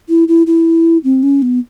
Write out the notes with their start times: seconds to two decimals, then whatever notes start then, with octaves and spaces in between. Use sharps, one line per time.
0.09 E4
0.28 E4
0.47 E4
1.04 C4
1.23 C#4
1.42 B3